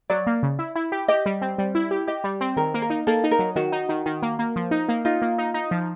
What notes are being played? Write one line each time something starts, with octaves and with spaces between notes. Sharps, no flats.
F#3 D5
A#3
C#3
E4
E4
G4
G4 D#5
G3
C4
G3
E4
G4
G4 D#5
G3
C4
D#3 A#4
A#3
A#4
D#4
A#3 A4
D#4
A#4
F#3
D#3 F#4
D#4
D#3
D#3
A#3
A#3
F3
D#4
A#3
D#4 F4
A#3
D#4
D#4
F3